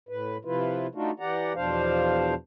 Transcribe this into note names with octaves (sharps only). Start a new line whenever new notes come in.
A2 B4
C3 F3 E4 F4 B4
A3 D4 D#4 F4 F#4
E3 G4 D5 F#5 A#5
E2 B2 F3 D4 C5 F5